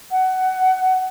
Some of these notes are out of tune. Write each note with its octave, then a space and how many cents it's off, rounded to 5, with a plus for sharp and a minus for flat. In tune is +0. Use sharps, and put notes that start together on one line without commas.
F#5 +20